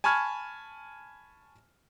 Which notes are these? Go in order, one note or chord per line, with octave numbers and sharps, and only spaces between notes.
G#5 A5 B5 C#6 F6 G#6